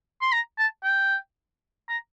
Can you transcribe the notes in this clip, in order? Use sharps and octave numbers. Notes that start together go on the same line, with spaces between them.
C6
A#5
A5
G5
A#5